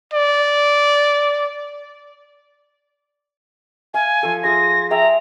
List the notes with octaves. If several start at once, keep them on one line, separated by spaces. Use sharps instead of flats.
D5
F5 G#5
F3 A4
F4 G#4 C6 A#6
G#4 E5 G5 A#5